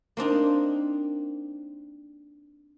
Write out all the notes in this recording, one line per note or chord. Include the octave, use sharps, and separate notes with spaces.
A#3 C4 D4 D#4